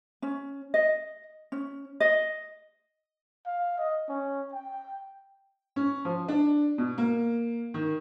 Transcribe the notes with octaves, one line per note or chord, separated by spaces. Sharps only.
C#4
D#5
C#4
D#5
F5
D#5
C#4
G5
C#4
F3
D4
B2
A#3
D#3